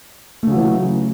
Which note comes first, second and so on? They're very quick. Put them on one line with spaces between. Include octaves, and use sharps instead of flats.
A3 C#3 F#3 E3